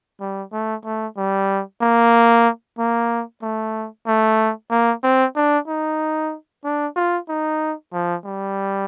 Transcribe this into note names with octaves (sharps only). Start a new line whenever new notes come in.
G3
A3
A3
G3
A#3
A#3
A3
A3
A#3
C4
D4
D#4
D4
F4
D#4
F3
G3